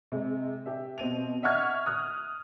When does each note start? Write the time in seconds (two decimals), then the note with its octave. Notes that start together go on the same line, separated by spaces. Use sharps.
0.12 C3 G#3
0.66 G4 E5
0.98 B2 C4 D#7 F7
1.43 D#5 E5 F#5 C#6 F6 G#6
1.86 D#6 F6 F#6